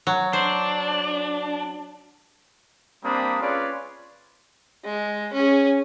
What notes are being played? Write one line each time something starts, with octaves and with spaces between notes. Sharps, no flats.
F#3
D4 C5
G3 A#3 C4 D4 B5 D#6
C#4 F4 G#4 B4 C#5 D5
G#3
C#4 G#4